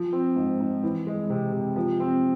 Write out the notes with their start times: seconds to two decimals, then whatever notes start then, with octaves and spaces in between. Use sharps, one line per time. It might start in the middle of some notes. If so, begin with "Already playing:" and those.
Already playing: F3
0.13 C4
0.36 G#2
0.60 G#2
0.83 E3
1.07 G#3
1.30 C3
1.53 C3
1.76 F3
2.00 C4